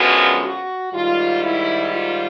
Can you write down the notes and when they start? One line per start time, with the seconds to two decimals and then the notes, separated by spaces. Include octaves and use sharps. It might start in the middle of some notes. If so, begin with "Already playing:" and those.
Already playing: F#2 D3 F3 G#3 B3 F#4
0.44 F#4
0.93 G#2 D#3 G3 F4
1.43 E4
1.94 F4